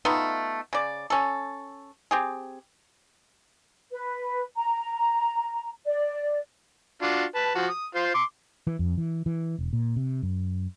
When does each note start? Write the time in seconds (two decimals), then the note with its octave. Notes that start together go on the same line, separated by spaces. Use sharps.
0.05 A3 B3 D#4 F4
0.73 C#3 D5
1.10 C#4 A4
2.11 C4 G4 G#4
3.91 B4
4.56 A#5
5.85 D5
7.02 D4 F4 F#4
7.35 B4 A5
7.55 F3 F#4
7.69 D#6
7.95 F4 C5
8.15 C6 D6
8.67 E3
8.79 F2
8.97 E3
9.26 E3
9.58 E1
9.73 A#2
9.96 C3
10.23 F#2